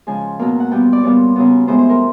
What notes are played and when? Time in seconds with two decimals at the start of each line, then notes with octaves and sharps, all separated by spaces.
0.07 C#3 F3 G#3 G#5
0.39 B2 F#3 A#3
0.60 F#5
0.71 A#2 G3 B3 G5
0.93 D5
1.03 A#2 G3 B3 C#5
1.36 C#3 F#3 B3
1.67 A2 E3 G#3 B3 C5
1.79 C5
1.89 A#4